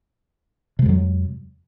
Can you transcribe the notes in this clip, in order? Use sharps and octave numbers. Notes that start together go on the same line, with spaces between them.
F2 C3 F#3 G#3